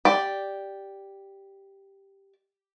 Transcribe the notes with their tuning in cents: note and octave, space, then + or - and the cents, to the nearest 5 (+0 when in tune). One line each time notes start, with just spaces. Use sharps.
G4 +0 D5 +0